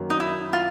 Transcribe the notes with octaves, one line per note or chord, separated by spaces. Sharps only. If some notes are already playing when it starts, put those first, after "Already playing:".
Already playing: F#2 D#3 F#3 A#3
D#4
E4
F4